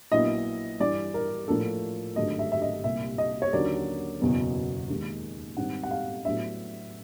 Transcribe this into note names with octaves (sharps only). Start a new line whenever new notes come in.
A#1 A#2 F#3 B3 E4 D#5
G2 E3 G3 D5
A#4
A2 F3 A#3 D4 A4
G#1 G2 D3 F#3 A3 D#5
E5
E5
D#5
C2 A#2 G3 E5
D#5
C#5
D#2 D3 F#3 A#3 C#4 D5
F#1 E2 B2 F#3 B3
D#2 D#3 G#3
G#2 D#3 G3 C4 F#5
F#5
F5
A2 F#3 B3 D4 E5